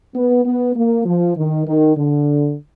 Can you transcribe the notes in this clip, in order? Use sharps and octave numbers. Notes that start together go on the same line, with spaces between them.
B3
B3
A#3
F3
D#3
D#3
D3